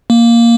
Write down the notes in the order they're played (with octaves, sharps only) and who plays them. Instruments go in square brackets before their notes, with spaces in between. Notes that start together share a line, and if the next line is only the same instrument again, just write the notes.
[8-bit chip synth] A#3